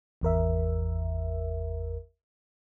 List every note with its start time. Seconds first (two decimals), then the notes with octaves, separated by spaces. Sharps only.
0.21 G#1 E2 A#4 E5